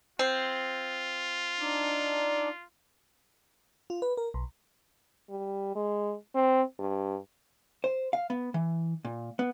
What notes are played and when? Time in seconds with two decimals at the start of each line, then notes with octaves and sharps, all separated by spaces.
0.19 C4 F4
1.59 D4 D#4 D5
3.90 F4
4.02 B4
4.17 A#4
4.34 B1
5.29 G3
5.75 G#3
6.35 C4
6.79 G2
7.84 C5
8.13 F5
8.30 B3
8.54 E3
9.05 A#2
9.39 B3